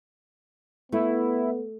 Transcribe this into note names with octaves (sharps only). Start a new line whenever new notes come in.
A3 B3 E4